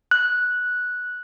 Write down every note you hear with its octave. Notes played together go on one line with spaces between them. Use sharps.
F#6